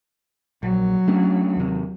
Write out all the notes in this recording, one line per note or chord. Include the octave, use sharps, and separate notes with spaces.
A#1 F#3
A3 C#4 D4
D#2 C3